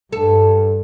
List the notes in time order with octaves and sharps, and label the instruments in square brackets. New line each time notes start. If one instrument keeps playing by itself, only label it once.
[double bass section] G2 [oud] A4